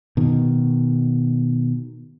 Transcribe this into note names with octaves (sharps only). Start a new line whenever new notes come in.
B2 D#3